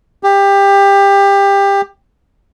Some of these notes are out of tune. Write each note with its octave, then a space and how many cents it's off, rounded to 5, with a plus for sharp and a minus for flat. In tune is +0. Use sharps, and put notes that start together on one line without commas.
G4 +20